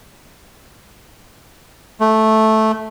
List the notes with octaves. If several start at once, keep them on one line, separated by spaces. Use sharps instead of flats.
A3